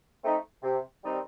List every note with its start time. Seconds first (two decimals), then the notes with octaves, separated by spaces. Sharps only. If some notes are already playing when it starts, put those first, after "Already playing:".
0.22 A3 C4 D#4
0.63 C3
1.03 D#3 G3 C4 D#4